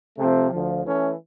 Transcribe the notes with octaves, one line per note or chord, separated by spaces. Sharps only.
C3 F3 A3 C4
D2 D3 F3
E3 A3 C#4